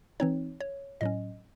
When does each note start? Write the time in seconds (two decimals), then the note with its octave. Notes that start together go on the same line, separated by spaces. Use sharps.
0.20 E3 C4 D#4 C#5
0.61 C#5
1.01 A2 F#3 C#4 D#5